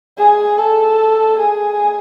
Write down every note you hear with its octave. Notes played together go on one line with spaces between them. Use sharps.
G#4
A4
G#4